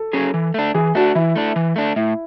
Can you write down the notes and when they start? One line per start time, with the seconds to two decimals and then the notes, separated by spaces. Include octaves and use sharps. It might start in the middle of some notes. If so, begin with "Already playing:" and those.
Already playing: A4
0.13 F#3 C#4 G#4
0.34 E3
0.54 A3 D4
0.74 E3 G#4
0.95 A3 D4 F#4
1.15 E3 E4
1.36 A3 D4
1.56 E3
1.76 A3 D4
1.96 A2 E4